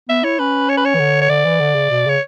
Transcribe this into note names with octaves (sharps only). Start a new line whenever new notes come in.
B3 E5
E4 C#5
C#4 B4
C#5
B4
C#5
E3
D3
C#5
D3 D5
E3
D3
C#3
B2
C#3 C#5